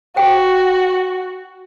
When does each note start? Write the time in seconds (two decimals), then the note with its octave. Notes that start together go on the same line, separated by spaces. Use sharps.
0.16 F#4 C5 G5